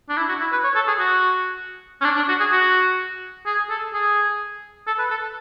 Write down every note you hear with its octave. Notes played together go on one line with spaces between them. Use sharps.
D4
E4
F#4
E4
B4
C#5
A4
G#4
F#4
C#4
D4
D4
F#4
G#4
F#4
G#4
A4
G#4
A4
B4
A4